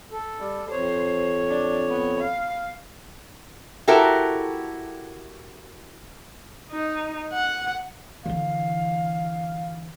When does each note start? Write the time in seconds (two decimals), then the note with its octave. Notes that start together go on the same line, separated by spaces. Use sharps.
0.12 A4
0.40 G3
0.71 F2 C5 C#5
1.49 D4
1.89 B3
2.19 F5
3.88 E4 F#4 G4 A4 A#4
6.71 D#4
7.33 F#5
8.26 D3 E3 F5